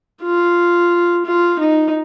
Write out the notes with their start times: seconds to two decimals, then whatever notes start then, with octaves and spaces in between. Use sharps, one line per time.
0.23 F4
1.25 F4
1.59 D#4